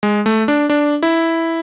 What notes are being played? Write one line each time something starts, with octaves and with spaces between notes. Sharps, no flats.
G#3
A3
D4
D4
E4